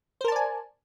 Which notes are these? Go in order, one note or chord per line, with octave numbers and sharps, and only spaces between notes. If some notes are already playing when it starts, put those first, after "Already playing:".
A#4 C5 D5 G#5 A5